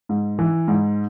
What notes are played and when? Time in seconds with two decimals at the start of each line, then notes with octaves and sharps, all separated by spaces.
0.09 G#2
0.39 E3
0.68 G#2